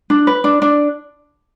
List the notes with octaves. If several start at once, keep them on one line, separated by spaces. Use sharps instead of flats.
D4
B4
D4
D4